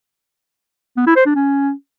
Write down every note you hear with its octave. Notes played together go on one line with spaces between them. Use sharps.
B3
E4
C5
D4
C#4